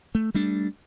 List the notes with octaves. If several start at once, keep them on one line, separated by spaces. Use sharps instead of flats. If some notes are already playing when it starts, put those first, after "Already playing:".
A3
G3 A3 D4